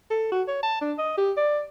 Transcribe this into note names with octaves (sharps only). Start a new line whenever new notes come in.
A4
F#4
C#5
A5
D4
D#5
G4
D5